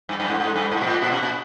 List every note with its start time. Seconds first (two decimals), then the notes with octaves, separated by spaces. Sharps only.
0.09 G2
0.20 G2
0.30 G#2
0.40 G#2
0.56 G2
0.72 G#2
0.81 A#2
0.87 A2
1.02 A#2
1.12 B2
1.22 A#2